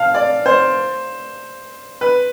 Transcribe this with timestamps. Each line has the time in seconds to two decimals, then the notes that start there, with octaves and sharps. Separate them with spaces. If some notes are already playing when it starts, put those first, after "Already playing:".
Already playing: F5 A5
0.14 D5
0.46 C5
2.01 B4